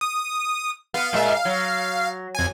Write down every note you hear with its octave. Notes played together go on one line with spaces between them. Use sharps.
D#6
B3 F5
A#2 G#3 E5
F#3
F2 G#5